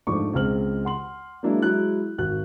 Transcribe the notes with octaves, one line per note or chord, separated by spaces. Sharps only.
G#2 F3 A3 D4 C#6 D6
C#2 G#3 C4 F6 F#7
F#5 C6 F#7
F#3 G#3 A#3 D4 E4
F#3 G#3 E4 F#6
G#1 F#4 F#6